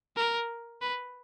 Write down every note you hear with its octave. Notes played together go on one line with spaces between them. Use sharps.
A#4
B4